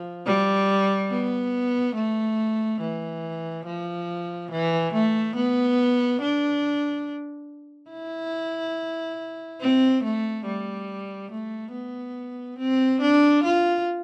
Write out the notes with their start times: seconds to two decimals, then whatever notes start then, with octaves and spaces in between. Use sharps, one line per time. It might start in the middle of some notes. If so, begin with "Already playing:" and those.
Already playing: F3
0.26 G3
1.10 B3
1.95 A3
2.81 E3
3.66 F3
4.52 E3
4.93 A3
5.36 B3
6.21 D4
7.91 E4
9.61 C4
10.04 A3
10.46 G3
11.31 A3
11.73 B3
12.59 C4
13.01 D4
13.44 F4